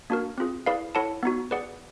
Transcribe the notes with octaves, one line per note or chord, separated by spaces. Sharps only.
A#3 D4 F#4 A#4
C4 F4 G#4
E4 G#4 B4 D5 F5
E4 A4 C#5 F#5 A5
B3 D#4 F#4
G#4 B4 D5 F#5